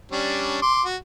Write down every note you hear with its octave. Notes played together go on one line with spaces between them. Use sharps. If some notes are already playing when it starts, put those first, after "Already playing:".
G3 C#4 D4
C6 D6
F#4